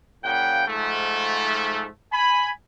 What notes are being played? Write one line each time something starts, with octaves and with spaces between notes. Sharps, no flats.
A#2 C#3 F#5 G5
G#2 F3 A3
G#5 B5